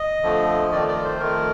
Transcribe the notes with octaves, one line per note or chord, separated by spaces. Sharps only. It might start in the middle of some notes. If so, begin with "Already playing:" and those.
Already playing: D#5
F2 D3 F3 A3
F2 D#3 A3 D5
D5
C5
F2 D#3 A3 A#4